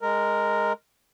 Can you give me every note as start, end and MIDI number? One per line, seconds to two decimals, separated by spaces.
0.01 0.73 56
0.01 0.73 70